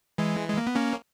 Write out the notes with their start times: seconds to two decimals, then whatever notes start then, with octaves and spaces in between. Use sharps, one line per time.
0.18 E3 G#3
0.49 G#3
0.58 A#3
0.67 B3
0.75 A#3 C#4